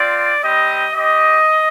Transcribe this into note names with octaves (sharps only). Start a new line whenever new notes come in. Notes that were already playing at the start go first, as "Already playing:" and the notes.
Already playing: C4 F4 D5
G3 C4 G4 D#5
C4 G4 D#5